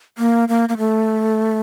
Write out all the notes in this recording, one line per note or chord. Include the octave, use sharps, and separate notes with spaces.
A#3
A#3
A#3
A3